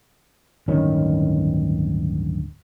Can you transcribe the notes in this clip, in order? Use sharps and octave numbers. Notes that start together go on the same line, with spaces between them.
D1 G2 D#3 C#4